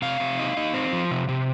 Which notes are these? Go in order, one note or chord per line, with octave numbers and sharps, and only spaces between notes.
C3 F5
C3
D#4
D#4
C4
F3
C3
C3